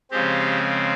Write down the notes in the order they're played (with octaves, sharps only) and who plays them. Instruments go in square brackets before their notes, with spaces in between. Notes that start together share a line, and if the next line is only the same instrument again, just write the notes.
[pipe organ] C#3 F3 G#3 C4 G4